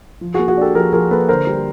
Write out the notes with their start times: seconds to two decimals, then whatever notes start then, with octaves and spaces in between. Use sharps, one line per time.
0.21 F3
0.34 A#3 F#4 G#4
0.48 F#4 G#4
0.57 D4 G4 A4
0.75 F3 G#4 A#4
0.92 F3 G#4 A#4
1.11 A#3 A4 B4
1.29 D3 A#4 C5
1.47 G3